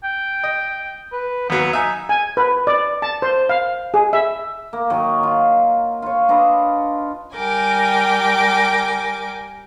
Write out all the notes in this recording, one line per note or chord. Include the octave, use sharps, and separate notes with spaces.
G5
D#5
B4
D#2 F#3 B3
D#4 E5 G#5
G#5
B4
D5
A5
C5
F5
G#4
E5
A#3
D#3 F#3
F4
F4 C#5
D4 F4 B4 D#5
G3 A#4 G5 G#5 D6